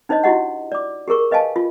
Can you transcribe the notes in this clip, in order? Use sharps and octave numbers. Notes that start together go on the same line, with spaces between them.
D4 D#4 C5 C#5 D#5
E4 F#4 G4 D#5 F#5
D5 D6
G4 G#4 A#4 C#6
B4 D#5 F5 G#5 A5
F4